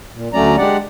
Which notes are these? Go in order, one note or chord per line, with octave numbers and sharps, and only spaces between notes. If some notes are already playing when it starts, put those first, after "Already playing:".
A#2
D2 F#3 A3 C#4 D5 A#5
G#3 D4 G4 D5 F#5